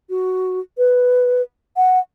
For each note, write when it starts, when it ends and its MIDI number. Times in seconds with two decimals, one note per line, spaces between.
0.10 0.60 66
0.78 1.42 71
1.77 1.99 78